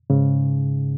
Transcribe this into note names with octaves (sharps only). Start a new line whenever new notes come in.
G#2 C#3